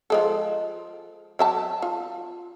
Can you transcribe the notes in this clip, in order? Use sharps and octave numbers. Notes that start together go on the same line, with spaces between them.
F3 G#3 A4
F#3 E5 A5
F4